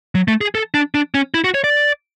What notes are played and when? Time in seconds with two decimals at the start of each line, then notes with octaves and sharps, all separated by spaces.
0.15 F#3
0.28 A3
0.41 G#4
0.55 A4
0.74 D4
0.94 D4
1.14 C#4
1.34 E4
1.44 F#4
1.54 C#5
1.64 D5